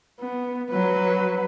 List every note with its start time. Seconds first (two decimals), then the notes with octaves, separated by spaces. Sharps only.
0.20 B3
0.70 F#3 B4